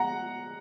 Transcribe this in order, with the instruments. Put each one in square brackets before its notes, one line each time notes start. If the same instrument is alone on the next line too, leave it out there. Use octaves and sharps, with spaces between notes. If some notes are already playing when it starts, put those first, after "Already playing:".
Already playing: [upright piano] F#5 A#5